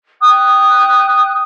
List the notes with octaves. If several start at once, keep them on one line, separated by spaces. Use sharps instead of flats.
G5 D#6 F#6